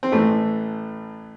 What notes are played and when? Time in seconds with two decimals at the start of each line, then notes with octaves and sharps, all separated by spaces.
0.03 C4
0.12 A1 A2 E3 A3